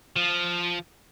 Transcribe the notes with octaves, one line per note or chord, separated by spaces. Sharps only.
F3